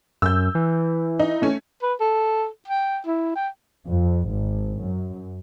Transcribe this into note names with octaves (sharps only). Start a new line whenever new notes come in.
F#2 E6 G6
E3
D#4
A3 C#4
B4
A4
G5
E4
G5
F2
G#1
F#2